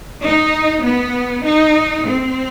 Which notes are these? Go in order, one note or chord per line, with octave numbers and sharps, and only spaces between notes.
D#4
B3
D#4
C4